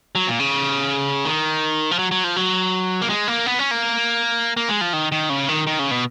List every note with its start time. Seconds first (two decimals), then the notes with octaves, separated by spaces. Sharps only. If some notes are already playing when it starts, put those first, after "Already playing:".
0.15 F#3
0.27 A#2
0.39 C#3
1.25 D#3
1.91 F3
1.99 F#3
2.11 F#3
2.24 F3
2.36 F#3
3.01 A#3
3.09 G#3
3.28 A#3
3.46 B3
3.59 C#4
3.71 A#3
4.57 A#3
4.69 G#3
4.81 F3
4.93 D#3
5.12 D#3
5.30 C#3
5.48 D#3
5.67 D#3
5.79 C#3
5.91 B2